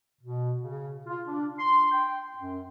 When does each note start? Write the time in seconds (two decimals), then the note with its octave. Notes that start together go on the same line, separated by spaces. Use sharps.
0.22 B2
0.62 C#3
1.07 F4
1.28 D4
1.58 C6
1.91 G5
2.37 F#2